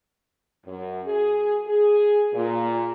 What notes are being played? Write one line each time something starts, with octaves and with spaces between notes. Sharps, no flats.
F#2
G#4
G#4
A#2